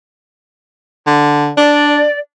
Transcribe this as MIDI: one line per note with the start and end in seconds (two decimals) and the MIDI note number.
1.07 1.52 50
1.57 2.04 62
1.57 2.18 74